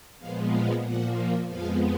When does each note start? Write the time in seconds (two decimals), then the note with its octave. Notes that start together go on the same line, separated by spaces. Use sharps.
0.18 A#2 F3 G#3 B3 F5
0.50 F5
0.82 A#2 F3 A#3 F#5
1.46 F2 F3 G#3 B3 F5